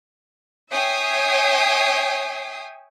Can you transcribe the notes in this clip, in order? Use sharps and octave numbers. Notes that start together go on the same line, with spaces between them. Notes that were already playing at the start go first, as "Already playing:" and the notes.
C#5 E5 G5 G#5 D#6 C7